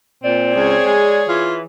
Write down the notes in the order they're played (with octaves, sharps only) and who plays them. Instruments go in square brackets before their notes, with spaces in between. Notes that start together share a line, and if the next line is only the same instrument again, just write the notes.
[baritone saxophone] A#2 [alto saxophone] C4 [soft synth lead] D5
[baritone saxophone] C#2 [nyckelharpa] G#4 C#5
[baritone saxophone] G#3
[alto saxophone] E3 [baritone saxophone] F4